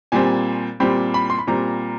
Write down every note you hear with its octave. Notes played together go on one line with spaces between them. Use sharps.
A#2 G3 C4 G#5
A#2 G3 C4 B5
B5
C6
B5
A#2 G3 C4 A#5